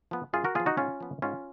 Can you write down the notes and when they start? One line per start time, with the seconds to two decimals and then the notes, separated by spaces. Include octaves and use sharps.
0.11 F3 B3
0.33 F#2 F4 G#4
0.45 F#4 A#4
0.55 F3 B3 F4 G#4
0.66 D#4 F#4
0.77 G#2 C#4 F4
1.00 F3 B3
1.22 G#2 C#4 F4